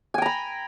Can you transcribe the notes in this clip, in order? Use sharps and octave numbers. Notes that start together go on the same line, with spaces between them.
G5 G#5 A#5 B5